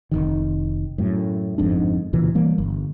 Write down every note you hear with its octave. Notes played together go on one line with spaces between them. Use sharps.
F1 A#1 D#3
F#2 A2
G1 F2 G#2 D4
C#2 A#2 E3
E3 G3 A#3
G1